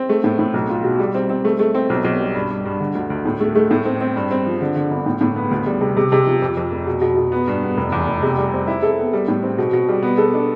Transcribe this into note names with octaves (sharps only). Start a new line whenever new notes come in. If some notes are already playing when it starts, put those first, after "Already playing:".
Already playing: C4
A3
A2
A2
B1
F4
B2
G3
C4
C4
A3
A3
C4
B1
B1
G3
G2
G2
G2
D3
D2
D2
A2
A3
A3
A2
C4
C4
G2
C4
F3
D3
D3
G1
A2
A2
B3
D2
G3
C3
C3
C3
F3
F2
F2
F1
B2
B2
B2
B3
G2
B3
F1
E2
F1
C3
G3
C4
E4
A4
B3
G3
A2
C4
B2
B2
G3
B3
A4
D4